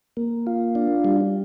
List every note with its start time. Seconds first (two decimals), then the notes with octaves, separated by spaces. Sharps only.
0.17 A#3
0.47 F4
0.75 D4
1.05 G3